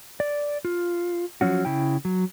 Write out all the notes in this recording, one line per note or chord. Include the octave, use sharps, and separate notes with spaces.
D5
F4
F3 F#3 C#4 F#4
C#3 E4 G5
F#3